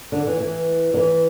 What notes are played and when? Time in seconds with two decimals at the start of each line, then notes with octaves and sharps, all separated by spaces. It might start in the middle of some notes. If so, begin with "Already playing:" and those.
0.12 D3
0.27 E3
0.40 E3
0.94 D3
0.97 E3